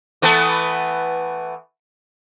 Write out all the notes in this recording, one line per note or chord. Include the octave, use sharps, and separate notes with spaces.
E3 A3 B3